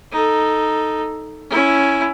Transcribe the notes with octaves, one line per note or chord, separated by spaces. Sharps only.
D#4 A4
C#4 E4